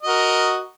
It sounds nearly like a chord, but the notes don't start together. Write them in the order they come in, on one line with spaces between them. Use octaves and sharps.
D#5 F#4 A#4